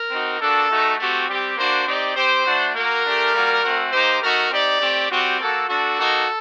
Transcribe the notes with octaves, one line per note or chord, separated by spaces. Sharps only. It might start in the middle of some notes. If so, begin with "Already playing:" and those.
Already playing: A#4
C4 D#4 F#4
A#3 D4 F#4 A4
A3 D#4 F#4
A3 C4 F#4 G4
G3 C4 G4
A#3 D4 F#4 C5
C4 D#4 G4 D5
C4 G4 C5
A3 D4 F#4
A#3 F#4 A#4
A3 D4 G4
G3 A#3 F#4
A3 C4 F#4
A#3 D#4 G4 C5
A3 D#4 F#4 A#4
C4 D#4 G4 D5
A3 C4 G4
G3 C4 F#4 G4
A#3 F#4 A4
A3 D4 F#4 A4
A#3 D#4 F#4